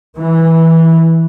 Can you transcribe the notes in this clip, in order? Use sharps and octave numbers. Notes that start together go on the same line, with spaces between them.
E3